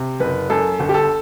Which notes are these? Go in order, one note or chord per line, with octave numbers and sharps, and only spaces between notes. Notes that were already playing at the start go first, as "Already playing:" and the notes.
Already playing: C3
F#1 B4
F#2 A4
G1
G4
A4